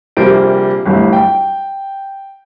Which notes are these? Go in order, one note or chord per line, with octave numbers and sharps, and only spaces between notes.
A#1 C3 G3 A#3 C5 D7
G1 C2 F#2 A2
G5